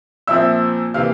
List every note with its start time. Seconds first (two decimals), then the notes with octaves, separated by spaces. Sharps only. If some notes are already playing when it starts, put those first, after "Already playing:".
0.27 A#2 F3 C4 E5 E6
0.94 C3 E3 A#3 F5 F6